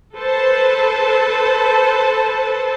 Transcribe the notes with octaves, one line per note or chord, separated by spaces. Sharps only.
A4 B4 C5 A5